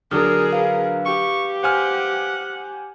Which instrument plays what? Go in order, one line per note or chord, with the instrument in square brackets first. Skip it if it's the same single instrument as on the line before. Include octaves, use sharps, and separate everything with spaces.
[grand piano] D3 F#3 D4 [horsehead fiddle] G#4 A#4 [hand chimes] D#6 F6
[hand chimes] B4 F5
[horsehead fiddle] G4 [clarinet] C#6
[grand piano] C5 G#5 F6 [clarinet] F#5